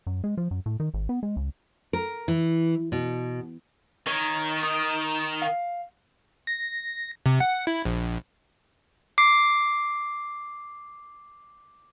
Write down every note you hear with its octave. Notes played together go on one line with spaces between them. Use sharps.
F#2
G#3
F3
F#2
A2
D#3
G#1
B3
G#3
C#2
A#4
E3
B2
D#3 C#5
D#6
F5
A#6
C3
F#5
E4
A#1
D6 C7